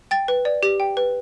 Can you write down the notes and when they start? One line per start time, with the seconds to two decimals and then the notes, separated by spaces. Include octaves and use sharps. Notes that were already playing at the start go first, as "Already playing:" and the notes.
0.11 G5 A6
0.28 B4
0.45 D5
0.63 G4
0.80 G5
0.97 B4